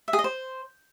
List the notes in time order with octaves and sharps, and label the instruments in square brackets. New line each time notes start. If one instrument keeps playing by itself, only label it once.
[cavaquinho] E5
G#4
D#5
C5